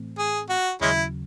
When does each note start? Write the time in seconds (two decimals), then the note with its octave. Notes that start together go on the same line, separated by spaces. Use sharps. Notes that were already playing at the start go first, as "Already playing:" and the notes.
Already playing: A2 E3 A3 C4
0.18 G#4
0.49 F#4
0.81 D#2 C#3 F#3 G#3 C#4 E4